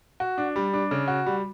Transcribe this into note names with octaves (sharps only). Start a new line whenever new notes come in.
F#4
D4
G3
D4
C#3
F#4
G3